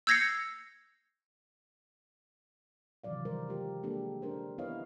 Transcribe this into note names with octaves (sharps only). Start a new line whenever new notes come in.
E6 G6 G#6 A#6 C7 C#7
C3 D#3 E3 F#3 D5 F5
G3 A#4 C5
G#3 F4 G4 A#4
G#3 A#3 D4 G4 A4
C#4 D4 A#4 C5
B3 E4 B4 C#5 D#5 F5